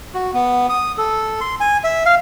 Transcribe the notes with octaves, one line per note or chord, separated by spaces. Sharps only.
F#4
B3
D#6
A4
C6
G#5
E5
F5